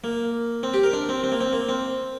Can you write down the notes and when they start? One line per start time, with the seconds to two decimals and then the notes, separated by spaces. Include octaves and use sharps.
0.04 A#3
0.63 C4
0.74 G4
0.83 A#4
0.93 D4
1.09 C4
1.24 C4
1.32 A#3
1.41 C4
1.53 A#3
1.69 C4